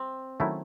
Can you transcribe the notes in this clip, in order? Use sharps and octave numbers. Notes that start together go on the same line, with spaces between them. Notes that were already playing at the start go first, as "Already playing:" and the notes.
Already playing: C4
D#3 F#3 A3 C#4 E4